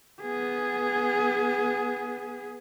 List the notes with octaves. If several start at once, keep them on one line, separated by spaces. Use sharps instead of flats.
B3 G#4